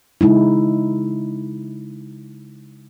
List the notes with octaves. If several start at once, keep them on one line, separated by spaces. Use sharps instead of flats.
C#3 G#3 D#4 E4